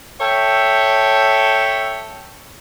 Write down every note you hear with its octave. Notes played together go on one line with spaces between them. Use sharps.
A4 C#5 E5 G5